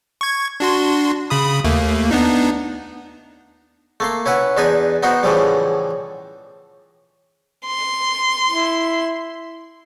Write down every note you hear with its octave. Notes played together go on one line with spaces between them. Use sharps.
C#6 G#6
D4 F#4 C6
C#3 B5 D#6
D#2 A3 A#3
B3 D4 D#4
A3 A#3 C6
C#4 E4 B4 F#5
E2 D4 D#4 B4 G#5
B3 D#4 F#4 C5
A2 C#3 E3 F3 G3
C6
E4